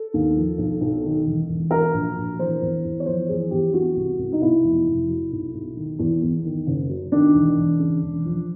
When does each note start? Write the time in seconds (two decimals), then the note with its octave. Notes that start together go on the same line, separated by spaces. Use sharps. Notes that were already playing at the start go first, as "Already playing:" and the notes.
Already playing: A4
0.14 D#2
0.36 F3
0.58 B1
0.81 B1
1.04 D#3
1.26 E1
1.49 E1
1.71 F#3 A#4
1.94 A#1
2.16 A#1
2.39 E3 C5
2.61 E2
2.84 E2
3.00 C#5
3.06 F3 C5
3.29 E2 G#4
3.51 E2 G4
3.74 F#3 F#4
3.96 C2
4.19 C2
4.32 D#4
4.42 B2 E4
4.64 F1
4.86 F1
5.09 F#3
5.32 B1
5.54 B1
5.77 D#3
5.99 E2
6.22 E2
6.45 D#3
6.67 F#1
6.90 F#3
7.12 D#3 D4
7.34 E1
7.57 E1
7.79 C#3
8.02 E1
8.25 F3